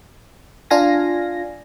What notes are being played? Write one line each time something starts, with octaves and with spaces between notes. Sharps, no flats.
D4 F4 F5 G#5 A#6